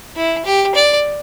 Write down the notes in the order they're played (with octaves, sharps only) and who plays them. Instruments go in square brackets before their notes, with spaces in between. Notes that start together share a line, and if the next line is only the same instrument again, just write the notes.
[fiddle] E4
G4
D5